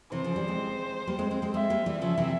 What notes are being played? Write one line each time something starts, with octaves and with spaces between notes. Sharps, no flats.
C3 E3 C5
C#3 F3
E3 G3
G#3 C4
G3 A#3
G#3 C4
G#3 C4
G#3 C4
G#3 C4 E5
G3 A#3
E3 G3
C#3 F3 E5
C3 E3